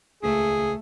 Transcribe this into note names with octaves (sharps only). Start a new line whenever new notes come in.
D#1 C#2 A3 G#4